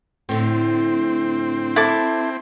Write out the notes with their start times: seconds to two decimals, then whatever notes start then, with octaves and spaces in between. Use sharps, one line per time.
0.29 A2 D3 C4
1.76 E4 A4 D6